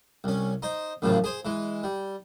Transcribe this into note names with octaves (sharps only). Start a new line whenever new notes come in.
C2 C#4
D#4 C5
A1 F#2 A2 C#3 F3
G#4 C5
E3 G#3
G3